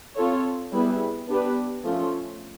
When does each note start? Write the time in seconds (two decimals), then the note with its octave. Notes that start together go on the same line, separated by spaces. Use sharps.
0.16 C4 F4 A4 C#5
0.73 G3 B3 E4 G#4 B4
1.28 B3 D4 G4 B4
1.84 F3 A3 C#4 F4